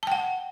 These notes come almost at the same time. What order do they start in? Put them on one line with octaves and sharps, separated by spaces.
A5 G5 F#5